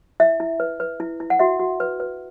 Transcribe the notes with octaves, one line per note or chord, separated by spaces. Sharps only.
E4 E5
E4
B4
B4
E4
E4
F#5
F#4 E5
F#4
B4
B4